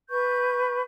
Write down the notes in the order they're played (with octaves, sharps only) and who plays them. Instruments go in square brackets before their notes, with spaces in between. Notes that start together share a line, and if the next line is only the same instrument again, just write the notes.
[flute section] B4 C#6 G6